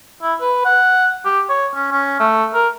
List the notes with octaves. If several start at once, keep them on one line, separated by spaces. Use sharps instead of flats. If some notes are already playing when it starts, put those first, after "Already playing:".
E4
B4
F#5
G4
C#5
C#4
C#4
A3
A#4